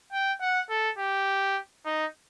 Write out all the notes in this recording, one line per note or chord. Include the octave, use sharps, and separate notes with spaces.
G5
F#5
A4
G4
D#4